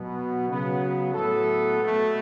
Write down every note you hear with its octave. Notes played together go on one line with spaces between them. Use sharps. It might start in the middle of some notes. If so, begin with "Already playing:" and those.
Already playing: B2 F#3 B3
C#3 F#3 B3
A2 F#3 B3 A4
B2 A3